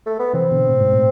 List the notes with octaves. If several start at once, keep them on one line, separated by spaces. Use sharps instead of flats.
A3
B3
C3 E3 C4
B2 D3
A2 C3
G#2 B2
A2